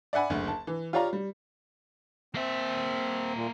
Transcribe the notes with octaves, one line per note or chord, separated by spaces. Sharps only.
D5 E5 F#5 G#5 B5
F#1 D2
A5
E3
F4 G4 C#5 D5 F5 A#5
G3
A#3 C4 E5
A#2